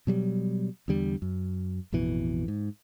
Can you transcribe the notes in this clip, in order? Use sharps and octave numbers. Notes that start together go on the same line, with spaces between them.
B2 F#3 G3
E2 D3 G3
F#2
A1 F2 B2 E3
G#2